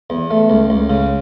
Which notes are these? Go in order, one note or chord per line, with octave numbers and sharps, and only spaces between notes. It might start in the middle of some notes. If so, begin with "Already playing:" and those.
E2
A3
C#2
C#2
C#3